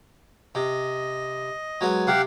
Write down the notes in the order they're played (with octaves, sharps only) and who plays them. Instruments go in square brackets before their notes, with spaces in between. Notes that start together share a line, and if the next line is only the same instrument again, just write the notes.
[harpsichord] C3 [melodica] D#5
[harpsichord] F#3 G#3 B3
[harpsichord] C3 [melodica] G4 F5 F#5